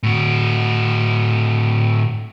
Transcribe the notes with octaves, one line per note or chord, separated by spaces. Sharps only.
A2 F#4